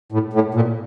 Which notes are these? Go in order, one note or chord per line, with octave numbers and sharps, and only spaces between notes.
A2
A2
A#2